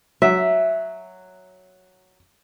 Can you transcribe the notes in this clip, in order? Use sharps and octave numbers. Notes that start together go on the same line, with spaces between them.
F#3 E5